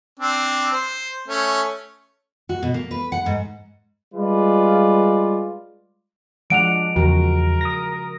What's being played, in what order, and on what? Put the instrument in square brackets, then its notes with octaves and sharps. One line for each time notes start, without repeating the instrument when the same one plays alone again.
[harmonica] C4 D4
C5
A3 C#4
[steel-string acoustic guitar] F#4
B2
A#3
B4
F#5
G#2
[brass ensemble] G3 G#3 F4 B4 D5
[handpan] F3 G#3 F#5 [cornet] D4 [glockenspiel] D7 F7
[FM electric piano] E2 [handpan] C#3 F3 F#4 [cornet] A#4
[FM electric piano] D#6 A#6